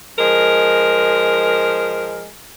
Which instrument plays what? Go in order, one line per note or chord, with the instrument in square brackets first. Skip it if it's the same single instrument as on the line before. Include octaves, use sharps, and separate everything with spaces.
[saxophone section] F3 G#3 A#4